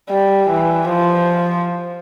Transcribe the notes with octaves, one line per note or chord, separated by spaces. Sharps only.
G3
E3
F3